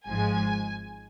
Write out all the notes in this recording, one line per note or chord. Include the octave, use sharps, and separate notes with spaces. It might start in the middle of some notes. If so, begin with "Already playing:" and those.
G#1 G#2 F3 G#3 G#5